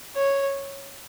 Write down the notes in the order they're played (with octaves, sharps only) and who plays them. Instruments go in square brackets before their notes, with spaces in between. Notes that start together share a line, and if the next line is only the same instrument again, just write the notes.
[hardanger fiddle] C#5